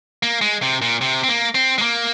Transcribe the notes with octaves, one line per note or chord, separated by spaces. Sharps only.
A#3
G#3
C3
A#2
C3
C4
A#3
C4
G#3
A#3